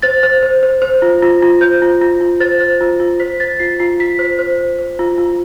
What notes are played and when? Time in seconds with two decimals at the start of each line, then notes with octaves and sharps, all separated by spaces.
0.02 C5 A6
0.23 C5
0.43 C5
0.63 C5
0.82 C5
1.02 F4
1.23 F4
1.42 F4
1.61 C5 G6
1.82 F4
2.01 F4
2.21 F4
2.40 C5 A6
2.61 C5
2.81 F4
3.00 F4
3.20 C5 B6
3.40 C5 A6
3.59 F4 C7
3.79 F4 C7
4.00 F4 B6
4.19 C5
4.39 C5
4.59 C5
4.79 C5
4.99 F4
5.18 F4